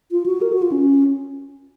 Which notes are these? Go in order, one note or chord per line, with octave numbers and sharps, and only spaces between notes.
F4
F#4
A#4
F#4
F4
C#4